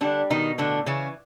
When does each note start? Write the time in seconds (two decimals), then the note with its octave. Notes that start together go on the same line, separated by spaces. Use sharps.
0.01 D3 G3 D4
0.30 B2 D#3 D#4
0.58 A2 D3 D4
0.86 C#3 E3 C#4